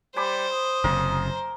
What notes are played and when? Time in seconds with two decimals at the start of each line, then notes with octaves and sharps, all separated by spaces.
0.16 G3 C5 G#5 B5 D6
0.52 D#6
0.84 F#1 C3 A#4